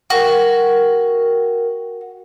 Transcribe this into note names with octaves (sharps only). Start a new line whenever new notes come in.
F#4 A#4 G5